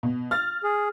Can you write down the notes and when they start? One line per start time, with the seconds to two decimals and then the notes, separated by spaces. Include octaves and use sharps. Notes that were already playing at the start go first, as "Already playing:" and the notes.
0.03 B2
0.31 F6 A6
0.64 G#4